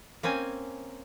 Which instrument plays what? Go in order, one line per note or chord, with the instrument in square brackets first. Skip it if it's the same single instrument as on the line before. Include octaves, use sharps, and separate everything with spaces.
[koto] A#3 C4 C#4 G#5